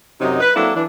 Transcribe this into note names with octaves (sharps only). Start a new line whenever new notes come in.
F#2 C3 F#3 D#4
B4
F#3 A#3 C4 D4 E4 A4
E3 D4